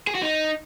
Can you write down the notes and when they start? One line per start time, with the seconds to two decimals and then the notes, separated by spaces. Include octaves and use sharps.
0.07 G#4
0.15 F#4
0.22 D#4